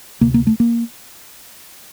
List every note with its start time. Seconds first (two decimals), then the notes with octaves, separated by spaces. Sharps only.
0.21 D2 C3 A#3
0.34 A#3
0.47 A3
0.60 A#3